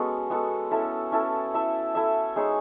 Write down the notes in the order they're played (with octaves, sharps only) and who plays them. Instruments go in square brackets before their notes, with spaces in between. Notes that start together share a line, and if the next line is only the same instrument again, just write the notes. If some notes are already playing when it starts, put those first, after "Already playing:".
Already playing: [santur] G#3 B3 C#4 F#4 A4
G#3 B3 F#4 A4
C#4 E4 A4
C#4 E4 A4
E4 A4 E5
E4 A4 E5
G#3 D#4 G#4 C#5